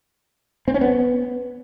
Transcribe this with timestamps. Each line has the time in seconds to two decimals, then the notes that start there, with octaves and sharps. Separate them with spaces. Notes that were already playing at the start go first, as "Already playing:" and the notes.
0.68 C4
0.74 C#4
0.81 B3